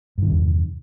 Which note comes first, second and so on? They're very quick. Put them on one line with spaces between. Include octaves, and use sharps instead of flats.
G2 D#3 C3 E2